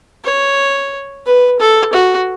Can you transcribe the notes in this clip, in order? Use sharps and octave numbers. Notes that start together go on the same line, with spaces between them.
C#5
B4
A4
F#4